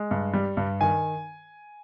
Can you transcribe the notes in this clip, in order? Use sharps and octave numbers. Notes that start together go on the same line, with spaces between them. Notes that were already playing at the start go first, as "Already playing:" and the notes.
Already playing: G#3
G2
G3
G2
D#3 G#5